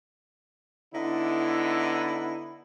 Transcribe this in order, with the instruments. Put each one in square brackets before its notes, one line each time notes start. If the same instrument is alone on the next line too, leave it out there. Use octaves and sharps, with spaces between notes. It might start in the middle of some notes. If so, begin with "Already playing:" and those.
[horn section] D3 B3 D#4 E4